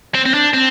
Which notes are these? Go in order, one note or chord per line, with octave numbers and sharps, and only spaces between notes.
C4
C4
D4
C4